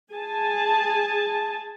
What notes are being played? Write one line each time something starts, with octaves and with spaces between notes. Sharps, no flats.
G#4 G#5 A5